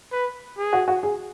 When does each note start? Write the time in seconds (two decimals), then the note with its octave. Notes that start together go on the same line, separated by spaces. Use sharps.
0.12 B4
0.57 G#4
0.73 F#4
0.88 F#4
1.03 G#4